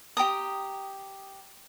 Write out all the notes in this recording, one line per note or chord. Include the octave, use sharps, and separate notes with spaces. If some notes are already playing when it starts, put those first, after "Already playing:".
G4 G5 A#5 D#6